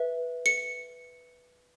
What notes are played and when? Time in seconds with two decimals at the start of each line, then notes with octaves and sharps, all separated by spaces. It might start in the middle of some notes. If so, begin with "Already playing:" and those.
Already playing: B4 E5
0.46 C#7